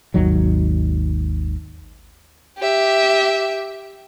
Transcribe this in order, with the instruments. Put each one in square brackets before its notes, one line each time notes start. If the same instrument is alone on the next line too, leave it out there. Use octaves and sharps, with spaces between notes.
[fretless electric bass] G#1 D#2 D#3 F#3
[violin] G4 E5